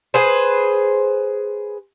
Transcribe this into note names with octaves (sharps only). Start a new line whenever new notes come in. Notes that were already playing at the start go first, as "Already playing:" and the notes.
G#4 B4 C5